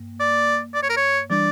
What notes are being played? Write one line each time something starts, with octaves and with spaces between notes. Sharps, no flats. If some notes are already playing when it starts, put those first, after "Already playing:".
Already playing: G2 A#3
D5
D5
C#5
A#4
C#5
E3 G3 D4 D5